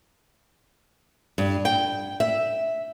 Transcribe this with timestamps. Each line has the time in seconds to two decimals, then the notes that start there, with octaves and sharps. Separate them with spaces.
1.38 G2
1.65 G5
2.20 E5